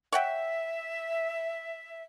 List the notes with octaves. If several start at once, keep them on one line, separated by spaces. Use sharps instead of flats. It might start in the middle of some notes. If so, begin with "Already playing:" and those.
C#5 E5 F#5 G5